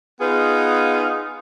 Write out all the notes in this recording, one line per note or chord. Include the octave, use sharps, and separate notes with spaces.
B3 D#4 F4 G#4 B4